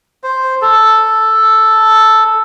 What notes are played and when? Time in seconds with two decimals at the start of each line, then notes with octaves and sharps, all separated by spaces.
0.23 C5
0.62 A4